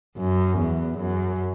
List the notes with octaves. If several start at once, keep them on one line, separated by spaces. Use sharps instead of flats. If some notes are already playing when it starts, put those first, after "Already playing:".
F#2
E2
F#2